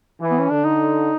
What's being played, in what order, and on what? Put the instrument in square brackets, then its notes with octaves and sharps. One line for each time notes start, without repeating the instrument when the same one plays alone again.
[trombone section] E3
[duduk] B3
C#4
[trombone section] D3 [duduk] D4
[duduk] D#4